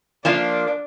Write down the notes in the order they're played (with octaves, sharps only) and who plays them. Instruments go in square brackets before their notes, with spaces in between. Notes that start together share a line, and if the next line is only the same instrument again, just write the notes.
[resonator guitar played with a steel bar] F3 A#3 F4 [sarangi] D4